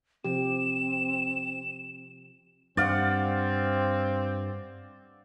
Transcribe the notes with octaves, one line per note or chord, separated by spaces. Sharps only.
C3 F3 C4 G4 E7
G2 C4 D5 F5 F#5